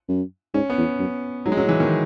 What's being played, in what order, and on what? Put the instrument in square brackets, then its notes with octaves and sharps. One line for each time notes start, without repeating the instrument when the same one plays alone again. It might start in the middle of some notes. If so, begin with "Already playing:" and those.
[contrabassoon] F#2
[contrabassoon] G#2 [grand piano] C#4
[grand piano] B3
[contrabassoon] E2
F#2
[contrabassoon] G#2 [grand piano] F#3
[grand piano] G#3
[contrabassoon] F#2 [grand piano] F#3
[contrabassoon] A2
[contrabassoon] G#2 [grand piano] E3
[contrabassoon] E2 [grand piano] D#3